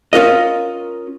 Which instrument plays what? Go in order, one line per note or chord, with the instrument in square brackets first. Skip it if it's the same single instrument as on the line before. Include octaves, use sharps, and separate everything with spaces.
[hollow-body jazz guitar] C#4 F4 A#4 D#5